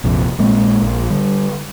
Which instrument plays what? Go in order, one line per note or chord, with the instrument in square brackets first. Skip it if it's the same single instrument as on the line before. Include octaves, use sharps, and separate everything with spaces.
[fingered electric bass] A#1 F2 C3
A#1 A#2 G#3 C4
A#1
D3 G3